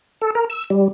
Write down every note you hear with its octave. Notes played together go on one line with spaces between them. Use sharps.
A4
A#4
E6
G3